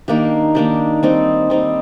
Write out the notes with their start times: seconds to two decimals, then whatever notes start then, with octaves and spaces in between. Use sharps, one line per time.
0.08 D#3 A#3 D4 G4
0.55 D#3 A#3 D4 G4
1.03 G3 C4 D#4
1.50 G3 C4 D#4